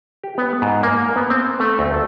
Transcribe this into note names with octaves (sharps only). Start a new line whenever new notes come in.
G4
B3
G#2
A#3
B3
C4
A3
D2
A4